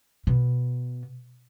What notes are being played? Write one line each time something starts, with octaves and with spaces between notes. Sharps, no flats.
B2